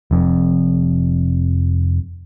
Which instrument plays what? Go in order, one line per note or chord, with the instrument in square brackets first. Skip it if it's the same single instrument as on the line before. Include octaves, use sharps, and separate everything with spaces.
[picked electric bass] F1 F2